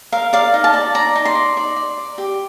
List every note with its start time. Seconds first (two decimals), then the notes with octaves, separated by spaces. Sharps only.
0.12 A#4 F5
0.33 D5 F5
0.54 D#4
0.64 A5
0.74 D5
0.95 D5 A#5
1.15 D#4
1.25 C6
1.35 D5
1.57 D5
1.76 D5
1.98 D5
2.18 G4